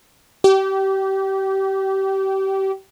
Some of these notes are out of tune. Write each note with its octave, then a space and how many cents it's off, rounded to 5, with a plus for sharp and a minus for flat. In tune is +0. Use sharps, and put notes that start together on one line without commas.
G4 -25